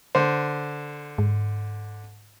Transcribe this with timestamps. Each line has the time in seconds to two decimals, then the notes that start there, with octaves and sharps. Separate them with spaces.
0.15 D3 C5
1.18 G#2